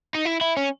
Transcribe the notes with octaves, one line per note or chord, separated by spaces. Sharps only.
D#4
E4
E4
C#4